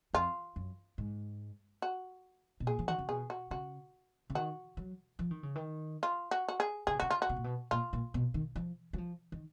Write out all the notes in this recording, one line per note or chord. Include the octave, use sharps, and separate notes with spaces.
F2 F4
F#2
G#2
F#4
B2
A#2 G#4
F3
D#3 F#4
C#3
B2 G#4
F#4
C#3 F#4
C#3
D#3 F#4
F#3
F3
D#3
C#3
D#3
F4
F#4
F#4
G#4
C#3 G#4
B2
C#3 F#4
F4
F#4
B2
A#2
B2
A#2 F4
A#2
B2
D#3
F3
F#3
F3
D#3